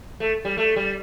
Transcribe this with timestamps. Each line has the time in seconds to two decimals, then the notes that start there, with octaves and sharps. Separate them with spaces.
0.20 A3
0.45 G3
0.57 A3
0.76 G3